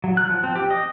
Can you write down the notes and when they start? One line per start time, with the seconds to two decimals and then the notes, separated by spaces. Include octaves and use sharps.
0.04 F#3
0.17 F#6
0.30 F3
0.44 C4
0.55 G4
0.70 D#5